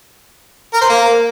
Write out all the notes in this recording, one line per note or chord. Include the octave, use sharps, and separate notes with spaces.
A#4
C5
A#3